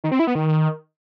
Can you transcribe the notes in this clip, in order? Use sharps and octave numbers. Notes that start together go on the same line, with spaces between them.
D#3
C4
E4
B3
D#3